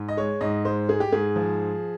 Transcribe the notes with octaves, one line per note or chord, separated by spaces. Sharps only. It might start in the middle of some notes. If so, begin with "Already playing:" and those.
Already playing: G#2
D#5
G#3 C#5
G#2 D#5
G#3 C5
G#3 G#4
G4
G#2 G#4
F3